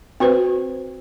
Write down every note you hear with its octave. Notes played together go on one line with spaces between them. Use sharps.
C4 F#4 B4 C5